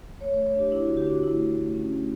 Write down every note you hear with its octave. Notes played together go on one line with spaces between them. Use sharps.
A3 C#5
C#5
A3
C#5
D4 G4
D4 E4
D3 F#4
G4
D4 F#4
A3 E4
A3
A3
C#4
A3